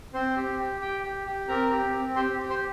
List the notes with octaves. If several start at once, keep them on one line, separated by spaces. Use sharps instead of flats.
C4 C5 C6
G4
G4
G4 G5
G4
G4
C4 A#4 A#5
G4
C4
G4 C5 C6
G4
C5 C6